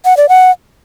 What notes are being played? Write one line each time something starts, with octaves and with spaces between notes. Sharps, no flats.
F#5
D5
F#5